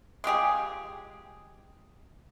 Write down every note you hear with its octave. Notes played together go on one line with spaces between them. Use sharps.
G#3 F4 G4 G#4